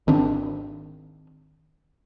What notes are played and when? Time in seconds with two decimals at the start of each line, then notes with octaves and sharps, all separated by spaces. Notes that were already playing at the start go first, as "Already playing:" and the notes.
0.07 G#1 D#3 C4 D4